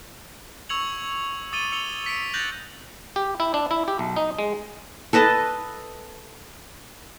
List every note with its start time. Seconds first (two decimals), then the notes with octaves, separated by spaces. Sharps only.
0.69 C#6 E6 G#6 C#7 F7 F#7
1.52 D6 D#6 A6 C#7 D#7 G7
1.72 E6 C#7 F7 G7
2.06 B6 C#7 D7
2.34 F#6 G6 A6 A#6 F7 F#7
3.16 G4
3.40 E4
3.54 D4
3.71 E4
3.88 G4
3.99 B1
4.16 D#4
4.39 G#3
5.13 A4 B4 D#5 A5